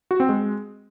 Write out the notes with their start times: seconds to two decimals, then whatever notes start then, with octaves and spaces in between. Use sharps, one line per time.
0.11 F#4
0.20 C4
0.29 G#3